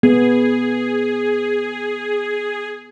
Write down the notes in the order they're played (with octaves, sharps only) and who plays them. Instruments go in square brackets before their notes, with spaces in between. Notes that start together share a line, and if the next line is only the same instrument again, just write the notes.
[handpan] B3 [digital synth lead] G#4